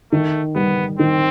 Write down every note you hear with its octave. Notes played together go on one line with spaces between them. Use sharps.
D#3 A3
G3 B3
D#3 C4